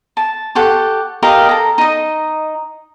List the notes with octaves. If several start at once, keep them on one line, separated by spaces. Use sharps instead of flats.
A5
G4 A4 F#5 C#6
G4 A#4 D#5 F5
A4 A#5
D#4 D#5